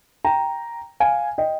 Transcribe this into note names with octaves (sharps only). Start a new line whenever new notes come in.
G5 A#5
F5 G#5
D#5 G5